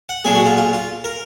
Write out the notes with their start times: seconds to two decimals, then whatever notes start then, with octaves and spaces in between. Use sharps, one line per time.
0.09 F#5
0.24 B1 A#2 G#3 D4 G#4
0.35 F#4
0.46 F4
0.57 F4
0.73 F4
1.04 A#4